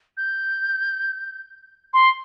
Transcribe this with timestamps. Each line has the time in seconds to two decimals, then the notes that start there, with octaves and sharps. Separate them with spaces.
0.17 G6
1.93 C6